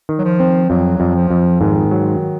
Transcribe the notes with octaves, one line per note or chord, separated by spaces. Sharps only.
D#3
F#3
F3
C4
F2 F#3
F2
F3
F2
G#2 D#3
F#3